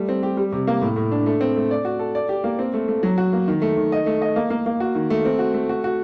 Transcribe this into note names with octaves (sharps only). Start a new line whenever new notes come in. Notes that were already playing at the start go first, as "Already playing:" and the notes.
Already playing: G3 A3
C4
G4
G3
C3
A#3
A2
A2
D4
A3
C4
A3
D5
F#4
A4
D5
G4
A#3
C4
A3
A3
F#3
F#4
A#3
D#3
A3
D#3
D#5
A3
D#5
A#3
A#3
A#3
F#4
D#3
A3
C4
F#4
A3
F#4
F#4